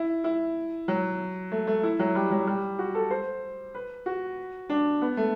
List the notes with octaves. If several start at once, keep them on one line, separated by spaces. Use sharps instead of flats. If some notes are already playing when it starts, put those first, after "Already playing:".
Already playing: E4
E4
F#3
A3
A3
E4
F#3
G3
F#3
G3
F#4
A4
C5
B4
F#4
D4
B3
A3